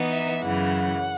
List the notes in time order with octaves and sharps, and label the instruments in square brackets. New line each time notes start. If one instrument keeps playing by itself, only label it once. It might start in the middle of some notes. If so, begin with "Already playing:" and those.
Already playing: [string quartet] E3 B3 D#4
[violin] E5
[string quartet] F#2 C#3 E3 [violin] F#5